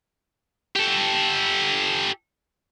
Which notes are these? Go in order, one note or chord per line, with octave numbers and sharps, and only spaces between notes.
G4 A4